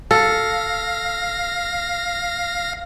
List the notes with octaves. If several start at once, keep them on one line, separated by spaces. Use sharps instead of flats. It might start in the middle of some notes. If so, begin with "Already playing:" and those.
A4 F5 A#6